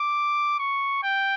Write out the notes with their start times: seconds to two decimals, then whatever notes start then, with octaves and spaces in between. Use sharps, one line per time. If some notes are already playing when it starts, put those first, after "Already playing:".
Already playing: D6
0.59 C#6
1.03 G5